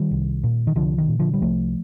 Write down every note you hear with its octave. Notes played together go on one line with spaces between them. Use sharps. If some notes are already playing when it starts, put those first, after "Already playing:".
Already playing: D#3 G3
C2
A#2
D#3
C2 D3 F3
D#3
A#2
D3 F3
G3
C2 F3 A3